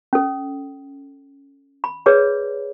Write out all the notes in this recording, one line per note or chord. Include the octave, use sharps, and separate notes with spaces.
C#4 A4
B5
G#4 B4 C#5 D5